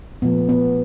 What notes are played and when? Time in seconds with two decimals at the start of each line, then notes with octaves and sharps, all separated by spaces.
0.22 A#2 F3 A3 B3
0.49 B3